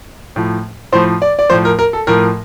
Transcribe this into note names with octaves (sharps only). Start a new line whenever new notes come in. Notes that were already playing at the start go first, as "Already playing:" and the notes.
A2 F3
A2 F3 C5
D5
D5
A2 F3 C5
A#4
A#4
A4
A2 F3 A#4